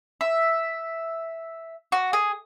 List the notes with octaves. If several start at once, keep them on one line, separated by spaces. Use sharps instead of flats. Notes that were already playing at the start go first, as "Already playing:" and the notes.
E5
F#4
G#4